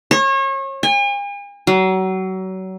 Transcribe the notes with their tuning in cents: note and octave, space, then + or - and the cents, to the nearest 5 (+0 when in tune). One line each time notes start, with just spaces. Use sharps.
C#5 -35
G#5 -45
F#3 +30